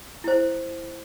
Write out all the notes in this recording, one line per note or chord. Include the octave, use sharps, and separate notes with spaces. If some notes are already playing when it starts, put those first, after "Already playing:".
E4 C5